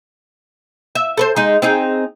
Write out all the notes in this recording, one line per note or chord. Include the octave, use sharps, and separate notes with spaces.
E5
A4 B4 C5
G#3 D#4
C4 D#4 G#4